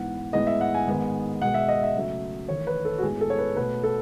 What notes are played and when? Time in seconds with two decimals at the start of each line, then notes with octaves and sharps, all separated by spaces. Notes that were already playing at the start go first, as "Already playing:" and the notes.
Already playing: G#2 E3 B3 F#5
0.33 A2 G#3 B3 D#5
0.47 E5
0.61 F#5
0.74 G#5
0.87 G#2 D#3 G#3 B3
1.41 B2 G#3 B3 F#5
1.54 E5
1.68 D#5
1.83 E5
1.95 C#3 F#3 A3
2.49 E2 D#3 A3 C#5
2.67 B4
2.85 A4
2.98 F#4
3.02 A2 G#3 B3 G#4
3.21 A4
3.30 C#5
3.38 B4
3.56 B2 A3 B4
3.84 A4